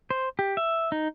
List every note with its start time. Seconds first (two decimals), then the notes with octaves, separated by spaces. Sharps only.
0.10 C5
0.39 G4
0.57 E5
0.92 D#4